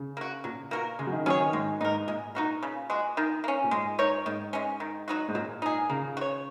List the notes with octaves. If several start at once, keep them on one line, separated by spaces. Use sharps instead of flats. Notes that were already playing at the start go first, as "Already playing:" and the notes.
Already playing: C#3
A#3 F#4
A#2 F#3
A#3 F#4 A#4
C#3 G#3
F#3
D#3
F#3 C#4 G#4 C#5
D#3
G#2 G#3
G#2 D#4 A#4
A#2 G#3
D#4 F#4 A#4
C#3
G#3 F#4
D#3
A#3
C#4
A#2
G#2 G#3
D#4 A#4 C#5
G#2 D#3
G#3 C#4
D#3
F#3 D#4 F#4
G#2
A#2 F#3
D#4 G#4
C#3 A#3
F#4
C#5